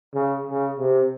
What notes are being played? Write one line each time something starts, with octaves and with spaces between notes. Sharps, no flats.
C#3
C#3
C3